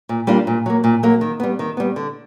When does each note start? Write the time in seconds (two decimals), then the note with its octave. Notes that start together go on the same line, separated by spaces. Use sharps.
0.09 A#2
0.27 G3 A#3 D4 F4
0.47 A#2
0.66 F#3 A#3
0.84 A#2
1.03 F#3 A#3
1.21 D#3
1.40 G3 B3
1.59 D#3
1.77 G3 B3
1.96 D3